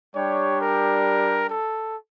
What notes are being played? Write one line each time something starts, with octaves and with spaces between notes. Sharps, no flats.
G3 D4 G4 C#5
A#4
A4